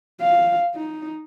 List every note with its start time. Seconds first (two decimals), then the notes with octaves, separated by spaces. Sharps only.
0.21 F5
0.75 D#4